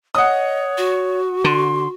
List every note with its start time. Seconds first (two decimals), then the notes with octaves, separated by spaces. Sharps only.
0.15 C#5 D#5 F#5 D#6
0.77 F#4
1.44 D3 C6